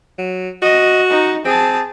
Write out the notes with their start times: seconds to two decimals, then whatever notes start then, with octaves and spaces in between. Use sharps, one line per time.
0.18 F#3
0.62 F#4 D#5
1.10 D#4
1.45 C4 G#4 A5